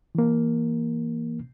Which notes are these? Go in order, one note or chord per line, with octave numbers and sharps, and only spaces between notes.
E3 A#3